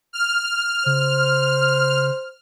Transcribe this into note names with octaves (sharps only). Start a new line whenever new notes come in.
F6
C#3 C5